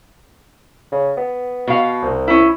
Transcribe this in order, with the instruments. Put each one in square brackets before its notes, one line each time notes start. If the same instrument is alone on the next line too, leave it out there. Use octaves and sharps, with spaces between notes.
[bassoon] C#3
B3
[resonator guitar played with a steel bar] B2 F5
[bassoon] C2
[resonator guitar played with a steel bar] C#4 E4